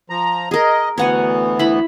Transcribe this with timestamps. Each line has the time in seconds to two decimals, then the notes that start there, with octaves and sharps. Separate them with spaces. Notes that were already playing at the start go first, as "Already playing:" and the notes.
0.10 F3 A#5
0.51 G#4 A#4 D#5
0.98 D2 E3 B3 C#5 F#5 G#5
1.59 E4 B5